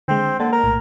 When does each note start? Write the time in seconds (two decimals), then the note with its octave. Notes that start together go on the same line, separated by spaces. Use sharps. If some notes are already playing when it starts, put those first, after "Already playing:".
0.08 D3 G#3 C4
0.40 D3 A#3
0.52 A#4
0.64 B1 A2